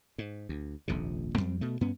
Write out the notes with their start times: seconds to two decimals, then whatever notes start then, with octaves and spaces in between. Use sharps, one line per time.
0.18 G#2
0.49 D2
0.88 D#1 A#1 F2 C3
1.35 F2 G#2 G3 C4
1.61 B2 A3
1.81 G2 B3 C#4